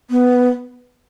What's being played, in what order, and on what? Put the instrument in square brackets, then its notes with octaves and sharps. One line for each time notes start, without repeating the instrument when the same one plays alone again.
[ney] B3